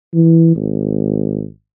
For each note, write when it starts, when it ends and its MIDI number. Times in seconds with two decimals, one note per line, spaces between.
0.14 0.54 52
0.56 1.45 32